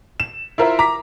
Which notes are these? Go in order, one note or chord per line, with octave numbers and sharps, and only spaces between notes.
E7
E4 F4 A#4 C5 E5
A#5 D6 B6